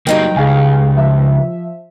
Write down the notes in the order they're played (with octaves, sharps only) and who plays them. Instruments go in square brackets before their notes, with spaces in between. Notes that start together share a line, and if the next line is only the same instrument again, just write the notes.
[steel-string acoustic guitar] G2 D#4 G5 [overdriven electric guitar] F#3 A#3
[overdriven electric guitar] C#2 [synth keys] G#4 F5 G#5
[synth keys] F3 E5